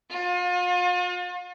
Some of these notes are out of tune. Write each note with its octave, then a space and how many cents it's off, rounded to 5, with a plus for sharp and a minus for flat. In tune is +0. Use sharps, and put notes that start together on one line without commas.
F4 +40